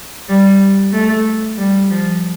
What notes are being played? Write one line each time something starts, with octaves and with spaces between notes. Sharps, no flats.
G3
A3
G3
F3